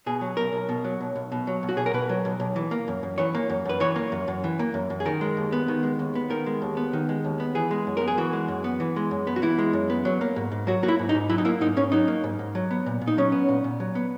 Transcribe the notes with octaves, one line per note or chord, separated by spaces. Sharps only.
B2 G#4
F#3
B1 A#4
B1
B2
F#3
B1
B1
B2
F#3
B1
F#4
B1 G#4
A#4
B2 B4
F#3
B1
B1
E3
A#3
F#2
F#2
E3 C#5
A#3
F#2
F#2 B4
E3 C#5
A#3
F#2
F#2
E3
A#3
F#2
F#2
G#4
D#3 A#4
G#3
D#2
B3
D#3
G#3
D#2
B3
D#3 A#4
G#3
D#2
B3
D#3
G#3
D#2
B3
E3 G#4
G#3
F#2
B3 A#4
G#4
E3 F#4
G#3
F#2
B3
E3
G#3
F#2
B3
F#4
E3 E4
G#3
F#2
B3
F#3
A#3
G#2
G#2
F#3 F#4
A#3 F#4
E4
G#2
D#4
G#2
F#3 E4
D#4
A#3 E4
G#2 D#4
G#2 C#4
F#3 D#4
A#3
G#2
G#2
F#3
B3
A#2
A#2
D#4
F#3 C#4
B3
A#2
A#2
F#3
B3